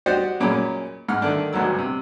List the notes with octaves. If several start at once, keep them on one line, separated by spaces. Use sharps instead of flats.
F#4 G4 C5 D5 D#5 F#5
F#2 A#2 G#3 C#4 B5
G#2 F#5 F6
D3 D#3 A3 D4
G#1 D2 G2 F#3 E6
C3